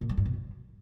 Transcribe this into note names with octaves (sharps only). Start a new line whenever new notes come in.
A#2
G3
G2
B2
F3